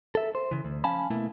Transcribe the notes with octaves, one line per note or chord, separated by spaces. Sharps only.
A4 E5
C5
C#3 E3
D2
F3 C#4 F5 G#5 A5 B5
B2 A3 A#3 E4